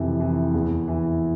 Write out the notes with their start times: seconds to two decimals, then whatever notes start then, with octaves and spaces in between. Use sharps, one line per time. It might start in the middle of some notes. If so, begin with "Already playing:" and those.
Already playing: F2 C3 E3
0.20 E3
0.54 E2
0.88 E3